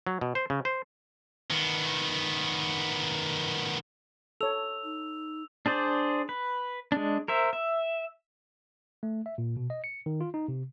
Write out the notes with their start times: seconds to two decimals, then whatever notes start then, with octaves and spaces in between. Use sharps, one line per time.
0.07 F#3
0.21 B2
0.35 C5
0.50 C#3
0.65 C5
1.51 D#3 B3
4.41 A4 C#5 E6 F7
4.84 D#4
5.66 D4 G#4 C5 D5
6.29 B4
6.92 G#3 D4
7.28 A#4 C5 E5
7.53 E5
9.03 A3
9.26 E5
9.38 A#2
9.57 B2
9.70 D#5
9.84 C#7
10.06 D#3
10.21 F4
10.34 D#4
10.48 C3